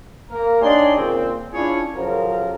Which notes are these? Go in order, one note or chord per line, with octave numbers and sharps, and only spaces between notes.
A#3 A#4
D4 D#4 G4 C#5 G#5 C6
A#2 C#3 C4
C#4 D4 E4 F4 G#4 C#5
C#3 F3 F#3 A4 A#4